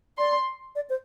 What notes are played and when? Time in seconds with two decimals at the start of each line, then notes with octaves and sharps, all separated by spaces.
0.18 D5 C6
0.75 D5
0.90 C5